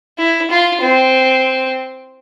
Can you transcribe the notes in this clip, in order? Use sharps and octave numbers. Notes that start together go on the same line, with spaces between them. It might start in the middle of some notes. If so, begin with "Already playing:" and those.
E4
F4
C4